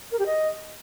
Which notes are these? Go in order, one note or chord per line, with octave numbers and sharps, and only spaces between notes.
A#4
G4
D#5